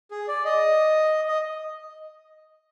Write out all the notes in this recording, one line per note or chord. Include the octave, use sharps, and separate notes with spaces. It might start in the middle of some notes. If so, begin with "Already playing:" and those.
G#4
D5
D#5
D#5